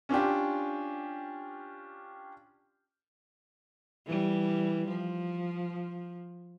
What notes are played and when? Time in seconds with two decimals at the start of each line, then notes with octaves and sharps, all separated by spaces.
0.09 C#4 D4 F4 G4
4.07 E3 G3
4.88 F3